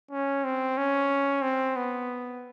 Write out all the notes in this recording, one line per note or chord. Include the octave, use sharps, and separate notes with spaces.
C#4
C4
C#4
C4
B3